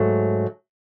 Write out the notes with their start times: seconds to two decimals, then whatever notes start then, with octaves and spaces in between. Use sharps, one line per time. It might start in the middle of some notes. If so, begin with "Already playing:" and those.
Already playing: G#2 F#3 A3